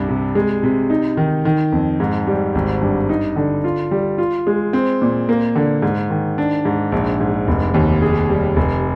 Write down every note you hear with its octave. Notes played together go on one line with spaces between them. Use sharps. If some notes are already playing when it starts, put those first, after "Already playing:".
Already playing: C2 G2
C3
G#3
C3
D#4
D#3
D#3
F2
G#2
G3
G#1
G2
D#4
D3
F4
G3
F4
G#3
C4
A#2
A#3
D3
G#2
D#3
D4
G#2
A#1
G#2
F1
D#2
G#4
G3
F1